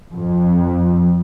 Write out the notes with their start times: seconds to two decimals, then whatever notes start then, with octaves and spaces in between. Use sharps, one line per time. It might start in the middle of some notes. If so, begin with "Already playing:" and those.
0.12 F2